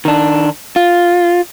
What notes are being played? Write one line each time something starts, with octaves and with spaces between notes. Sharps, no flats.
D#3 D4
F4